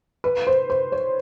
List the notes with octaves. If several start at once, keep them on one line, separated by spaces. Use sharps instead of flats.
B4
C5
C5
C#5